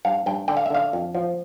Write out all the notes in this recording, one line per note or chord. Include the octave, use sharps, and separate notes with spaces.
G2 F5
G2 G5
D3 G5
F5
E5
D3 F5
F2
F3